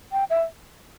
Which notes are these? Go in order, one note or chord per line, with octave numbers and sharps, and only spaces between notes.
G5
E5